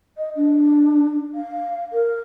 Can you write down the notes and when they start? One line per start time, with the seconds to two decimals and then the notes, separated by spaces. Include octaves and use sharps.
0.17 D#5
0.36 D4
1.34 F5
1.93 A#4